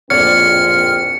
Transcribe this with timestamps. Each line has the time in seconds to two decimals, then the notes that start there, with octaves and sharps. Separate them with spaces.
0.10 D1 A#1 F2 C4 C#5 D5 F6 C#7